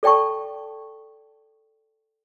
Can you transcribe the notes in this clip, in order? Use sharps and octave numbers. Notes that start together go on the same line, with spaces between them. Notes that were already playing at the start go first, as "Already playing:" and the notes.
A4 D5 G5 A5 C#6